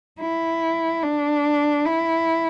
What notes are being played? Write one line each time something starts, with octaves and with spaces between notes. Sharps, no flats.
E4
D4
E4